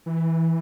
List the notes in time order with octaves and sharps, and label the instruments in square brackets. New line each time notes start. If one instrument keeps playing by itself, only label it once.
[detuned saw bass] E3